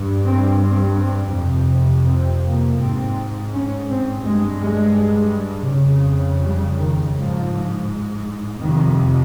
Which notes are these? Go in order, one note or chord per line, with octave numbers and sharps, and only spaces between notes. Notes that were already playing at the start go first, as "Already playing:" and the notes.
Already playing: G2
C4
C4
C4
F2 C3
C4
A#3
G#2 C4
C#4
C4
G2 G#3
G#3
C#3
F2
G3
D#3
G#2 F3
F2 C3 D#3